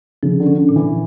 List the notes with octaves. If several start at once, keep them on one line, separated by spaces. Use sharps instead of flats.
C#3 F3
D3
C#4
D3
A#2
E3